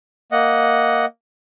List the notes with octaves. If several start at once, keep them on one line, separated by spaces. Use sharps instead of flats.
A#3 D#5 F#5